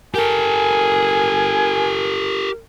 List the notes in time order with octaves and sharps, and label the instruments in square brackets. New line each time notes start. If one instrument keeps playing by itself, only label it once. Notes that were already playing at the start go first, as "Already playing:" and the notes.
[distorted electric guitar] G4 A4 [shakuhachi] A#4 [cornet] G#5